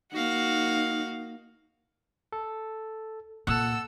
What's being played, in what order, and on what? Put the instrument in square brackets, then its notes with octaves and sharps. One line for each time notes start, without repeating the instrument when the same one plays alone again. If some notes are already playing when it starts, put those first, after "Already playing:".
[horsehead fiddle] A#3 D#4 [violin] F#4 F5
[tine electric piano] A4
[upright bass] A#2 [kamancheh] A4 E6 [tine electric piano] F#5 F#6